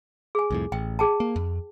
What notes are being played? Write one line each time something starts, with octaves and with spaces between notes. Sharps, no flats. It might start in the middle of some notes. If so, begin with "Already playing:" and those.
G#4 G#5
C2 F2 A2
A1 G5
G#4 G5 A5
A#3
F2